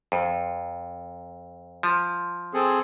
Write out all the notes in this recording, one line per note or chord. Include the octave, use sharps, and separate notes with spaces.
F2
F3
C4 G#4 A4